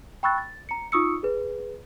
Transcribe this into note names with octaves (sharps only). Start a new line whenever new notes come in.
G5 B5 C#6 E6 F#6 A6
A6
A#5 C#7
D#4 F4 C#6 D#6 E6 C#7
G#4 B4